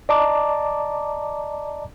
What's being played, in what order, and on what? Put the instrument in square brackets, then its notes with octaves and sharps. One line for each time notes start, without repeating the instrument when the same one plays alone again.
[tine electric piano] D5 D#5 A5 A#5 D6